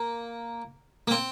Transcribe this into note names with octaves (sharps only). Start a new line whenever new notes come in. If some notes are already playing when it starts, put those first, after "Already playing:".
Already playing: A#3
A#3
C4